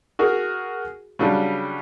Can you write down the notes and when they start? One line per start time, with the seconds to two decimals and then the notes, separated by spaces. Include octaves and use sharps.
0.19 F#4 G#4 A#4
1.19 C#3 F#3 G3 D4